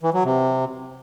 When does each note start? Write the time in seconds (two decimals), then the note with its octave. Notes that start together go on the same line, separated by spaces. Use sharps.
0.03 E3
0.14 F#3
0.24 C3